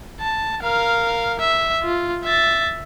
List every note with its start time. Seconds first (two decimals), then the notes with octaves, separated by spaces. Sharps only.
0.20 A5
0.62 A#4 F5
1.39 E5
1.83 F4
2.24 E5 A6